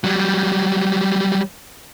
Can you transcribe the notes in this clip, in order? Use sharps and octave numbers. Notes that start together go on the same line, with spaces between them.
F#3 G3